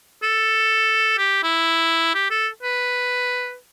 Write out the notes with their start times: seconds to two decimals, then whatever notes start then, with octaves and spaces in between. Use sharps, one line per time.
0.23 A4
1.18 G4
1.43 E4
2.14 G4
2.31 A4
2.63 B4